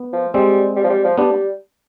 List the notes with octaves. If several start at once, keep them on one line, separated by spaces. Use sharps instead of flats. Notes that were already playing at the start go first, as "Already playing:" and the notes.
Already playing: B3
F3
G3 G#3 C4
G3
F3
G3
F3
G3 B3 D4